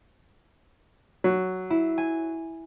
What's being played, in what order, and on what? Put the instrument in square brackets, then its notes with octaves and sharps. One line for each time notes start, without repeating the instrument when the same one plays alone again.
[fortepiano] F#3
[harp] E4
G#5